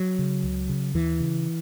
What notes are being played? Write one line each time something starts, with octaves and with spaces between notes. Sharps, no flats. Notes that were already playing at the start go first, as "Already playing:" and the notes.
Already playing: F#3
C#3
C#2
C#3
D#2 E3
C#3